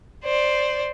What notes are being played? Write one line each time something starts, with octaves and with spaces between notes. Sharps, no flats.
C5 D5